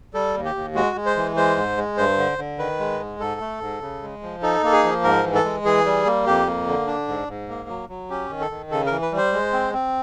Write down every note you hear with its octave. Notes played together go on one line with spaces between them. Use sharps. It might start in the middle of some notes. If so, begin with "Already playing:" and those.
G3 A4
D#2
G4
D#2
G#3 F#4
G#3
C5
E3
G#3 C5
G#2
G#3
G2 C5
D3
D3
D#3 B4
G#3
G#2
G#2 A4
A3
G#2
C#3
G#3
F3
D#4 A4
A#3 A4
G#4
F3
G#2 A#4
E3
A4
G#3
E3 G#4
G3
A#3
F2 G4
A#3
D3
D4
G#2
G#2
A#3
F#3
F#3
C#4 G4
D#3
A4
D#3
C#3 A4
A#4
E3
B4
G3
C5
G#3
C4
C4